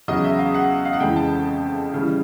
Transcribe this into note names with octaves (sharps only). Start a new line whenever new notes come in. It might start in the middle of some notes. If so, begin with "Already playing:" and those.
E2 C#3 F#3 D#5
E5
F5
F#5
F5
F#5
F2 C#3 E3 G#3 G5
A5
C#3 E3 G3